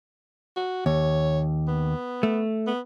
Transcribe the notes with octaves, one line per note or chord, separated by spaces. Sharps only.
F#4
D#2 C#5
B3
A3
B3